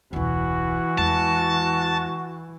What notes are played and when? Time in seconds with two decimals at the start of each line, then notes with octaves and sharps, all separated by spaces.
0.13 E1 C#2 E3 F#4
0.98 E2 G#3 A5